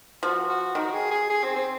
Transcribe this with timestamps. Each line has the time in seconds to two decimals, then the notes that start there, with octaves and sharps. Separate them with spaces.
0.23 F3 F#4
0.49 F#4
0.75 D#3 F#4
0.93 G#4
1.11 G#4
1.30 G#4
1.43 C4
1.56 C4